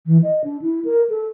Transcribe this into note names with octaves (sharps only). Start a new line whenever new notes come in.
E3
D#5
D4
E4
A#4
A4